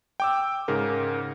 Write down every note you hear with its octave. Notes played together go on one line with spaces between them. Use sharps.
G5 D6 E6
G#2 C#3 A#4